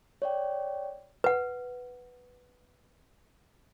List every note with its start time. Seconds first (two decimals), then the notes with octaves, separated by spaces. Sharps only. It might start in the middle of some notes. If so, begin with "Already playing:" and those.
0.22 C#5 D5 G5
1.24 B4 F#5